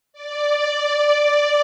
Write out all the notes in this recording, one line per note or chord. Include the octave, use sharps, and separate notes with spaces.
D5